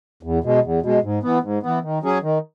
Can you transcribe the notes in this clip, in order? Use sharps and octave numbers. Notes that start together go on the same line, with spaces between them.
E2
B2 G#3
E2
B2 G#3
G#2
E3 B3
G#2
E3 B3
D#3
F#3 C#4 G#4
D#3